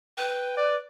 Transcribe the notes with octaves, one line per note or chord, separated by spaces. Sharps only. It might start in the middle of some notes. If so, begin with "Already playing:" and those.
B4 G5
D5